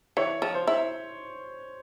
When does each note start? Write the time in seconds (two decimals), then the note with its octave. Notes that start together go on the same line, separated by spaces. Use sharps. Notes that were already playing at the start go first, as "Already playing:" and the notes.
0.17 E3 C#5
0.42 F3
0.55 C5
0.67 E4